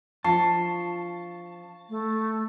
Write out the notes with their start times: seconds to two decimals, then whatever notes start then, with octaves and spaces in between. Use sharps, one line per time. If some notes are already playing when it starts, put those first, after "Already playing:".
0.24 F3 D4 F4 A5 C#6 C7
1.90 A3